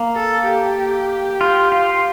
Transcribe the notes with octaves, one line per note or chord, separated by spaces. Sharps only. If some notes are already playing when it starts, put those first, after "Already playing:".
Already playing: A#3
A4
G4
F4
F4